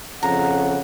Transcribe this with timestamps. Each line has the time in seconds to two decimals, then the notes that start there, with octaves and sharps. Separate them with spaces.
0.23 F2 C#3 F#5 A#5